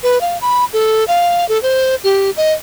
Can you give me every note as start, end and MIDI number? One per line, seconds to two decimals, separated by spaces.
0.03 0.18 71
0.21 0.38 77
0.41 0.65 83
0.73 1.05 69
1.08 1.48 77
1.49 1.61 69
1.63 1.95 72
2.04 2.30 67
2.37 2.53 75